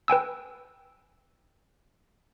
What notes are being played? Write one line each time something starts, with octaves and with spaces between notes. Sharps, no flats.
B4 G5 G#5 E6